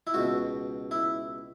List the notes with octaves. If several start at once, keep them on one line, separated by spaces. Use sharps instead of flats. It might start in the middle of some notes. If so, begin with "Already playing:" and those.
E4
C#2 B2 F#4
E4